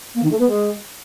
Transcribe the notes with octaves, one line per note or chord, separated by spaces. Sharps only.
A#3
D#3
A3
B3
G#3